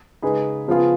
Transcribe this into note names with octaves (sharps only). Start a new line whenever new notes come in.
C#3 G#3 D#4 G#4 B4
C#3 F3 B3 F4 G#4